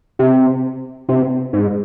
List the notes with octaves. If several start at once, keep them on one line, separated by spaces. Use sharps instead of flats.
C3
C3
G#2